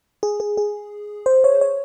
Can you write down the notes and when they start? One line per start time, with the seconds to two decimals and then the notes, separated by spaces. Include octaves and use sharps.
0.23 G#4
0.40 G#4
0.57 G#4
1.26 C5
1.44 C#5
1.61 C#5